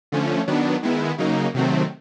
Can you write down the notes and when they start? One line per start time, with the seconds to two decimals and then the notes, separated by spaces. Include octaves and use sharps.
0.12 D3 F3 A3 C#4
0.47 D#3 F#3 B3 D4
0.83 D#3 G#3 B3 E4
1.18 C#3 F#3 A#3 D#4
1.54 C3 D#3 F#3 A3 C4